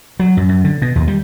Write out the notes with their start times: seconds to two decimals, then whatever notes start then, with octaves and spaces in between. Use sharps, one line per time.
0.20 F#3
0.37 F#2
0.49 F#2
0.64 D3
0.82 B2
0.96 D#2
1.08 G3